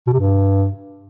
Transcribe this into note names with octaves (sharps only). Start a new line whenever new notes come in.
B2
C3
G2